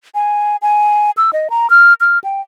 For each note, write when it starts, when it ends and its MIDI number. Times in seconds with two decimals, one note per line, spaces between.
0.15 0.56 80
0.62 1.11 80
1.17 1.31 88
1.33 1.48 75
1.50 1.69 82
1.70 1.94 89
2.01 2.19 89
2.24 2.41 79